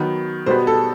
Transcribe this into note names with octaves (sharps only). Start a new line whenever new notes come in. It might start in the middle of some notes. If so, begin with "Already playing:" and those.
Already playing: D#3 F#3 B3
B2 G3 B3 C5
A4